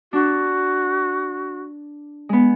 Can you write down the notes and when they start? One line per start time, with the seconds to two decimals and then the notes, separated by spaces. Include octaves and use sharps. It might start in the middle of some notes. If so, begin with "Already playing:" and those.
0.13 D4 F#4
2.29 G#3 B3